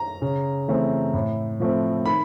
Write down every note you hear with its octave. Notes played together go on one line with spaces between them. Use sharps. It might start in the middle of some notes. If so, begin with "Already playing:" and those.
Already playing: A#5
C#3
E3 A3 C4
A2
F3 A3 C4
D#3 B5